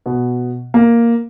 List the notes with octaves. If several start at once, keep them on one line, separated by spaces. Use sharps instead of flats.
B2
A#3